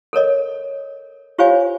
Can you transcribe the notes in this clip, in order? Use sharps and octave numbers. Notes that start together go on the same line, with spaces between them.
A4 A#4 C#5 D#5
F4 G4 C5 C#5 F5 G#5